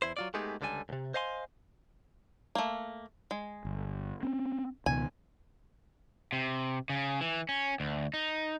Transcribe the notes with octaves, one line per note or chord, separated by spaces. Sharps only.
E2 E4 C5
F#3 F4 D5
G#3 A3 B3 D#4 G4 G#4
C#2 D3 G3 A4 G#5
C#2 C3
C5 D#5 F5 G#5 C6
A3 A#3
G#3
G1
C4 C#4
C#2 B2 D#3 G#5
C3
C#3
E3
C#4
D2
D#4